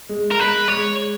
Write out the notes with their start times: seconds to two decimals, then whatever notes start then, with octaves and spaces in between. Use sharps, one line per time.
0.09 G#3
0.31 A#4
0.39 G#3 B4
0.68 G#3 C#5